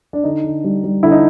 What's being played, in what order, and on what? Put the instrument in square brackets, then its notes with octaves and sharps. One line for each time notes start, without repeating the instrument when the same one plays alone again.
[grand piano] D4
D3 D#4
D3
G3
G3
D3 E4
D#4